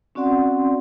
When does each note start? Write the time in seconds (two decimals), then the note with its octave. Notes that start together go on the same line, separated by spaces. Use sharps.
0.15 C4 C#4 F#4 D5 F#5 C6